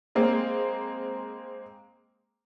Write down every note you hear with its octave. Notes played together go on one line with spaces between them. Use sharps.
G#3 A#3 C4